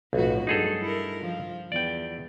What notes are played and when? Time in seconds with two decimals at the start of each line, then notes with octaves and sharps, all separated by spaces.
0.13 B1 F2 A2 F#4
0.47 G2 F#3 D#4 G#4 A4
0.81 E4 A#4
1.20 F3 F4
1.72 E2 D5 G5